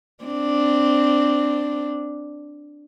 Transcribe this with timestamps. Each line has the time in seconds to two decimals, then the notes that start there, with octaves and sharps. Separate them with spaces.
0.25 C4 D4